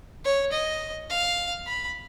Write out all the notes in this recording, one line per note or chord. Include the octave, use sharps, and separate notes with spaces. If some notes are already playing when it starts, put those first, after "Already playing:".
C#5
D#5
F5
B5